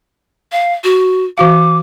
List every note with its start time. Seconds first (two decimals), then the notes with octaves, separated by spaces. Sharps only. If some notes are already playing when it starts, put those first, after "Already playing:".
0.52 F5
0.84 F#4
1.38 E3 F#4 F5 D6